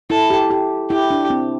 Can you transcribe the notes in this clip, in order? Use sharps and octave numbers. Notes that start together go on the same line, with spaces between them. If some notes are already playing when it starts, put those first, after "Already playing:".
E4 A4
G4
G4
E4 G4
D4
C4